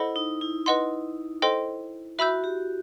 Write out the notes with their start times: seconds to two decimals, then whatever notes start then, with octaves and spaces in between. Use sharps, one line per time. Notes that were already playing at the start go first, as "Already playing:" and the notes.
Already playing: E4 A4 C5 D#5 F#5 B5
0.16 D#4
0.41 E4
0.66 B4 D#5 F#5 C6
1.42 A4 C5 D#5 G5 C6
2.19 F#4 E5 B5 E6 G6
2.44 G4